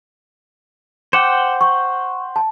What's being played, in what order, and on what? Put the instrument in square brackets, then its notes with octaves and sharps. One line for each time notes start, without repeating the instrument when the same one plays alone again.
[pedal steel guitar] C5 F#5 G5 [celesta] D6 C#7 E7
[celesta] C#6
A5